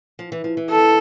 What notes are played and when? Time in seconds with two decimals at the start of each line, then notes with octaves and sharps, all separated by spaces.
0.19 F3
0.32 E3
0.44 F3
0.57 E3
0.70 A4